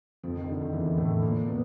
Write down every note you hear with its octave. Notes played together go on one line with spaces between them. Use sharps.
F2 F3
D#3
D3
D#3
E2 E3
A2 A3
A#2 A#3
B2 B3